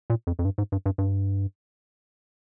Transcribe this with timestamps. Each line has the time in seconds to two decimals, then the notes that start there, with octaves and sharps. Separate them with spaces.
0.10 A#2
0.27 F2
0.39 F2
0.45 G2
0.58 G#2
0.72 G2
0.86 G2
0.98 G2